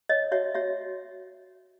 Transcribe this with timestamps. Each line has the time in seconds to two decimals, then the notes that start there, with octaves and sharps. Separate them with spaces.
0.09 C#5 D#5
0.32 F#4 C#5 E5
0.55 F#4 C#5 E5